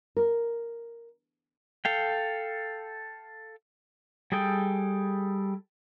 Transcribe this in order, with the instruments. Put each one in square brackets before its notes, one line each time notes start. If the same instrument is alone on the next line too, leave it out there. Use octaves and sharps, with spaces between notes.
[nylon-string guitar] A#4
[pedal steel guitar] A4 F5 G5
G3 G#4 A4 G5